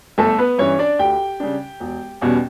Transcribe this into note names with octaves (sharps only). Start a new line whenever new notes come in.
G1 A3 A4
B3 B4
G2 E3 C#4 C#5
D4 D5
D2 G4 G5
C#3 G3 D4
E1
E2 B2 G3 C#4